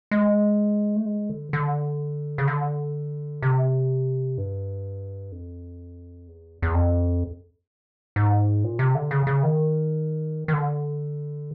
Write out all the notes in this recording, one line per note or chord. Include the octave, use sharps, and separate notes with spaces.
G#3
A3
G#3
D3
D3
C#3
D3
C3
G2
F2
E2
E2
F2
G#2
A#2
C3
D3
C#3
C#3
D#3
D#3
D3